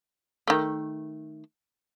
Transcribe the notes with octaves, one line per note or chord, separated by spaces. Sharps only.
D#3 A3